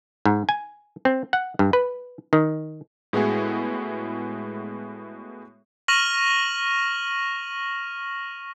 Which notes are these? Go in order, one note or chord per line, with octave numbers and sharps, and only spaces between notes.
G#2
G#5
C4
F#5
G2
B4
D#3
A2 G#3 B3 E4 F#4 G#4
C#6 F6 A#6 D#7 F7 F#7